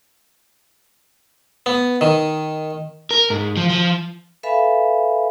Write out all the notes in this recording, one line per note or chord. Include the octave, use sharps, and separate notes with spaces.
B3
D#3
A#4
G#2
F3
F3
A4 B4 E5 F5 G#5 B5